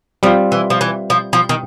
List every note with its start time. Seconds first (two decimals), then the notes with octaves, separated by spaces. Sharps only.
0.23 F3 G3 C4 F4
0.52 E3
0.70 F3
0.81 E3
1.10 F3
1.33 F3
1.49 D#3